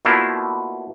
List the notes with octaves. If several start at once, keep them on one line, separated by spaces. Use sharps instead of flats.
B2 A3 A#3 D4 E4 F4